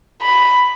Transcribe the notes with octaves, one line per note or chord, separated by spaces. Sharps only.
B5